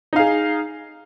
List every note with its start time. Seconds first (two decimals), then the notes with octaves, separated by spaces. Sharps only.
0.13 D#4
0.16 F5
0.19 G#4